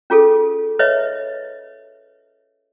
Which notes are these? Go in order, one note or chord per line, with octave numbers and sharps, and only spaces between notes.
C#4 F4 G#4 A4
B4 C#5 D#5 E5